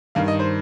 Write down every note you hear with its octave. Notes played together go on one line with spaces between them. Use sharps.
G2 D#3 F5
D#5
C5